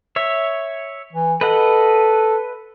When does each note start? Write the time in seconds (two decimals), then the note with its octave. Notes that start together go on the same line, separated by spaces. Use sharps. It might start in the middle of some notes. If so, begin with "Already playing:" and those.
0.16 C#5 E5
1.13 E3
1.41 A4 B4 D#5 F#5